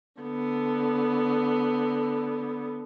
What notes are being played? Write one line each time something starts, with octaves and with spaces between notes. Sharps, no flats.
D3 B3